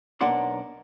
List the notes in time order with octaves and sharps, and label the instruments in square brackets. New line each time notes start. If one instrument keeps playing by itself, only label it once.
[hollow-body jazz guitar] B1 A#3 D4 D5 F#5 C6